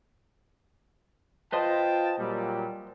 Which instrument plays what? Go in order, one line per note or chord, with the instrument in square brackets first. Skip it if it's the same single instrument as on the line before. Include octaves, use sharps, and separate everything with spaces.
[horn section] F4 G5 A5 [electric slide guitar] B4 C5 D#5
[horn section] A#2 F#3 G3